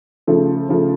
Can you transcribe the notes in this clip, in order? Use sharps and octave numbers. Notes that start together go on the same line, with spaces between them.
C#3 F3 A3
C#3 F3 A3